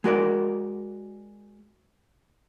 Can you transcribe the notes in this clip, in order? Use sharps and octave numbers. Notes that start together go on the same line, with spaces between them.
G#3 F#4 A#4 D5